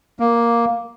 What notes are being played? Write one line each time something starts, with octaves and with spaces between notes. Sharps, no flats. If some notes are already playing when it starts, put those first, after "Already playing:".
A#3